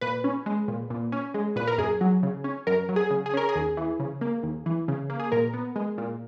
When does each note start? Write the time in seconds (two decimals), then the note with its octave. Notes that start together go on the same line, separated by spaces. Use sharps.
0.01 A#2 B4
0.24 C#4
0.46 G#3
0.68 A#2
0.90 A#2
1.12 C#4
1.34 G#3
1.56 A#2 B4
1.67 A#4
1.78 F#2 G#4
2.01 F#3
2.23 C#3
2.44 C#4
2.67 F#2 A#4
2.89 F#3
2.96 G#4
3.10 C#3
3.26 G#4
3.34 C#4 A#4
3.49 G#4
3.56 D#2
3.77 E3
4.00 C#3
4.21 A#3
4.43 D#2
4.66 E3
4.88 C#3
5.10 A#3
5.20 G#4
5.32 A#2 A#4
5.53 B3
5.76 G#3
5.98 A#2